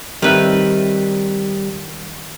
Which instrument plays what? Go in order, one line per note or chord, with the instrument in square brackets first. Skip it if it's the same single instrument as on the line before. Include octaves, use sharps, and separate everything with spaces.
[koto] D#3 B4 [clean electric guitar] G3 C4 E5